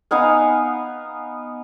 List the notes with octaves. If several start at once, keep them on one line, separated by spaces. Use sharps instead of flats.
B3 D#4 F5 G#5